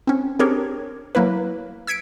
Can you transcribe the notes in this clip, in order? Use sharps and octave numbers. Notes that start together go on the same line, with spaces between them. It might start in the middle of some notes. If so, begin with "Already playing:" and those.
C4 C#4
C4 D4 G4 G#4 A#4 C#5
F#3 A#3 E4 B4
E6 G#6 B6 C#7 D7